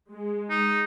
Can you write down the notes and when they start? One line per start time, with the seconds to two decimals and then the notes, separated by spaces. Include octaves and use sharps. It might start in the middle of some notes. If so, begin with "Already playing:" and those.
0.12 G#3
0.50 D#4